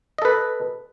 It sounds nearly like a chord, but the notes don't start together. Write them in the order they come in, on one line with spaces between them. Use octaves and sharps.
D#5 A4 B4